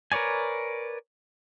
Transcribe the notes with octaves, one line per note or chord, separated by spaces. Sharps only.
A#4 B4 C#5 D5 G#5